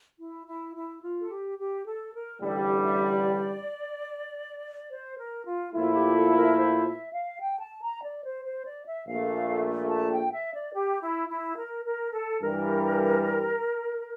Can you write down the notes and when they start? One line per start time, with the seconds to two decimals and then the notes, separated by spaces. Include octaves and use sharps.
0.19 E4
0.46 E4
0.74 E4
1.01 F4
1.20 A4
1.29 G4
1.58 G4
1.85 A4
2.13 A#4
2.40 A1 G2 D3 G3 A4
2.62 G4
2.83 E5
3.03 D5
4.91 C5
5.18 A#4
5.46 F4
5.74 A#2 F3 A3 E4 F4
5.95 G4
6.16 A4
6.36 A#4
6.57 C5
6.85 E5
7.13 F5
7.41 G5
7.61 A5
7.83 A#5
8.03 D5
8.24 C5
8.45 C5
8.65 D5
8.86 E5
9.07 A#1 A#2 A3 F5
9.90 A5
10.11 G5
10.32 E5
10.54 D5
10.73 G4
11.01 E4
11.30 E4
11.57 A#4
11.85 A#4
12.12 A4
12.40 G2 E3 G3 A#4